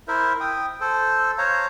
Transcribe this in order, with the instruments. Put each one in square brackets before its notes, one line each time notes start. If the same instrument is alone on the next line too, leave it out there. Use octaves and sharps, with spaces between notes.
[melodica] E4 A#4 C5 E5
G5 D#6
A4 C5
C5 C#5 F5 A#5